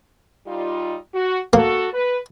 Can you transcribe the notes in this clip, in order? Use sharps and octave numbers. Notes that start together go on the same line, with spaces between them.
G3 D#4 F4
F#4
A#3 F#4 A4
B4